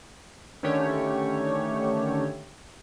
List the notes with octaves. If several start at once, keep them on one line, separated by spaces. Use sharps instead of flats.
D3 D#3 A3 C#4 G4 C#5